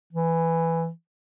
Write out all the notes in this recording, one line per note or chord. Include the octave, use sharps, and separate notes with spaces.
E3